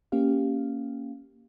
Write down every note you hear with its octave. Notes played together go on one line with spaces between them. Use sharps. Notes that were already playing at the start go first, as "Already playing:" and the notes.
A#3 C#4 G4 F5